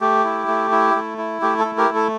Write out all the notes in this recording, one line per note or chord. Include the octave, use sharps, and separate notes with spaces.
A3 G4
E4
A3
E4
A3
E4
A3 G4
A4
E4
G4 A#4
A3
A4